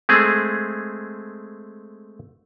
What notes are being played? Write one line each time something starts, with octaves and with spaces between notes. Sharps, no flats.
G#3 A3 C4 G#4